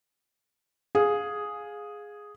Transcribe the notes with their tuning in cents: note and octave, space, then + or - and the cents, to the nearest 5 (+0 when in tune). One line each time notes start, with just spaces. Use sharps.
G#4 +0 F5 +20